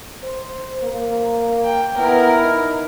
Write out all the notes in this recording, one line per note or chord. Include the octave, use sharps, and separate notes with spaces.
C5
A#3
G5
B3 E4 A#4
D#4